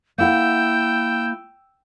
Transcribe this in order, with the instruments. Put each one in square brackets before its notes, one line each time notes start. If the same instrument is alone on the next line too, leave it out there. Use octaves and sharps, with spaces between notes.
[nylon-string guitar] A#3 E4 F#5 [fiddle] G5 E6 [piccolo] G6